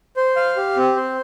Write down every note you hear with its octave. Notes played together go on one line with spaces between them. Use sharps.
C5
F5
G4
C4
C5